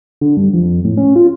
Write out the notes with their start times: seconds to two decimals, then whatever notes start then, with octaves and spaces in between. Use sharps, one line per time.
0.21 D3
0.37 G2
0.53 F2
0.85 A2
0.97 C#4
1.16 F4